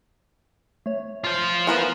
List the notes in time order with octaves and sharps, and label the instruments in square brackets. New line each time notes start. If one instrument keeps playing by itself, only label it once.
[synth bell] A3 C#5
[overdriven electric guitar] F4 C5
[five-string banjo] B3 A#4 B4